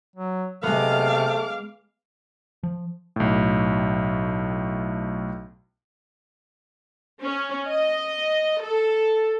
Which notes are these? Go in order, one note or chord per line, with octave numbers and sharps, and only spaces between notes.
F#3
C3 G#3 A3 B3 F5 D6
F3
B1 A2
C#4
D#5
A4